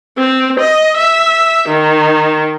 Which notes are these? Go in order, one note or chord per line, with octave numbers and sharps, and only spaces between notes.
C4
D#5
E5
D#3